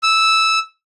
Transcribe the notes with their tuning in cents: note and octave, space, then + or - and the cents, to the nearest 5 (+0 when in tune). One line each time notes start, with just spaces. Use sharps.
E6 -10